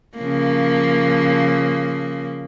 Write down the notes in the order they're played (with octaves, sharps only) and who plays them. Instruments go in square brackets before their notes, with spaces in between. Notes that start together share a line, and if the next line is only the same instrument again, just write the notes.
[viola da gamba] C#3 F3 A#3